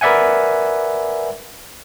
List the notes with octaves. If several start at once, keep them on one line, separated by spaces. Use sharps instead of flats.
A#4 B4 D5 E5 F#5 G#5